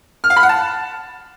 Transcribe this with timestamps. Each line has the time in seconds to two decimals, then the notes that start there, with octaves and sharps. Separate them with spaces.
0.24 F6
0.30 F5
0.36 B5
0.43 F#5
0.49 A5